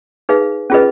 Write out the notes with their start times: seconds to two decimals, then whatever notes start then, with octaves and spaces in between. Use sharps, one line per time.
0.29 D#4 G#4 B4 F5
0.70 C#4 F4 G#4 B4 D#5